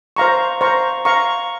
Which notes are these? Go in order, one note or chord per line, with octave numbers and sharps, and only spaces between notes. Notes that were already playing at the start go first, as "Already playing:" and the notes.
C5 F5 A#5 C#6
C5 F5 A#5 C#6
C5 F5 A#5 C#6